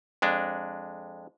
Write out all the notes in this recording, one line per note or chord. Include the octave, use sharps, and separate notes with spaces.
F2 G#3 D4